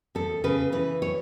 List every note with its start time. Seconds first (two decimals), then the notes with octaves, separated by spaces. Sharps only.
0.15 E2 A4
0.44 C#3 B4
0.72 E3 B4
1.02 C#5